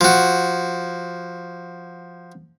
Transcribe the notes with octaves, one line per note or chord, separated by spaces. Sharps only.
F3 F#4